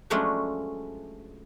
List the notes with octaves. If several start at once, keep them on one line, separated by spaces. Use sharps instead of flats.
F3 F#3 G#3 A3 C#4 D4